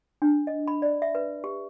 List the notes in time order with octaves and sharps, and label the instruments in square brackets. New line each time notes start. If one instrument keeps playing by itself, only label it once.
[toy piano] D4
D#5
B5
D5
E5
B4
G4